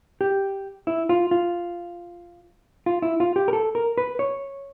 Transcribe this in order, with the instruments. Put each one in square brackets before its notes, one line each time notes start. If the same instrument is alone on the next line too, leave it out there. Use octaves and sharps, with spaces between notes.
[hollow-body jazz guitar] G4
E4
F4
F4
F4
E4
F4
G4
A#4
A4
A#4
B4
C#5